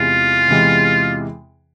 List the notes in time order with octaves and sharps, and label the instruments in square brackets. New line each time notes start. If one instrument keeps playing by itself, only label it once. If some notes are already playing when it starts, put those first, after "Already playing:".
Already playing: [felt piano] E2 C3 E3 G#3 [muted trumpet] F4
[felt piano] E2 C3 E3 G#3